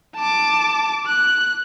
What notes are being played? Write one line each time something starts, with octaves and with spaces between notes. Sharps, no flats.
A5 D6
F#6